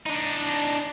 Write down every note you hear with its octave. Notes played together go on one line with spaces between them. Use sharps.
D4 D#4